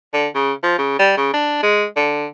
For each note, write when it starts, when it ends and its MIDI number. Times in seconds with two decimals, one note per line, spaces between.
0.14 0.28 50
0.35 0.53 49
0.63 0.78 53
0.78 0.94 49
0.99 1.13 55
1.17 1.29 49
1.34 1.61 62
1.63 1.85 56
1.97 2.27 50